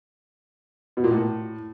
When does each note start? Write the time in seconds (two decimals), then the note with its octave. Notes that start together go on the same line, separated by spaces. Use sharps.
0.97 B2
1.04 A#2
1.11 A2